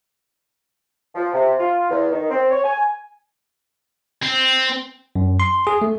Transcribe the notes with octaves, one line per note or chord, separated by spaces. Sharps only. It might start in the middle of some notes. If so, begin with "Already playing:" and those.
F3
C3
F4
E2
D#3
C4
C#5
G#5
C4
F#2
C6
G#4
A3